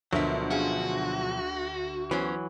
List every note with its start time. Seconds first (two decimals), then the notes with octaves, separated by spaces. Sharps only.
0.13 D2 B2 F3 F#3 A#4 E5
0.51 C#4 F4 F#4 G#4
2.11 E3 F#3 B3 C#4 C5